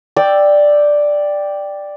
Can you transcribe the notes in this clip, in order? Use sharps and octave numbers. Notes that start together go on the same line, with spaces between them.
D5 G5 E6